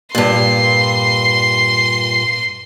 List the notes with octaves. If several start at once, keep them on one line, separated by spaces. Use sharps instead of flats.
G2 A#2 C6